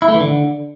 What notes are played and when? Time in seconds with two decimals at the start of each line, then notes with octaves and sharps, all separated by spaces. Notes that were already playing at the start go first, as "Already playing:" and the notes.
0.02 E4
0.08 A3
0.14 E3
0.20 D3